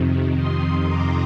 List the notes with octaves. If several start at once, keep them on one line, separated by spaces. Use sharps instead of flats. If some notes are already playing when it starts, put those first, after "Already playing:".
Already playing: F2 C3 D#3
C6 D#6
A#5 D6